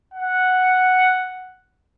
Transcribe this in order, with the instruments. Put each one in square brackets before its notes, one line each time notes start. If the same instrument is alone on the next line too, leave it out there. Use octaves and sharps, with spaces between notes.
[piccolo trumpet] F#5